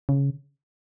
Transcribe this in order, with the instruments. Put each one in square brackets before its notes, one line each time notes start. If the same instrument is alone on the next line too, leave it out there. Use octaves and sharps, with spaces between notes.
[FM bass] C#3